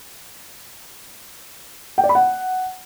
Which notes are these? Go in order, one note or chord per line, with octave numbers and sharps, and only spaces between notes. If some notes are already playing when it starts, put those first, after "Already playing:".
G5
D5
B5
F#5